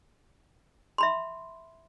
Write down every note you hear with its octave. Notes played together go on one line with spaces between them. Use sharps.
E5 B5 C6